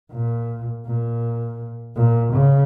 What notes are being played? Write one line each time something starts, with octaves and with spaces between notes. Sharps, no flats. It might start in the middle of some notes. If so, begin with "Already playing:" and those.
A#2
A#2
A#2
C#3